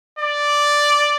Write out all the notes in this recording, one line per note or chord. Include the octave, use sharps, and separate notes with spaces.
D5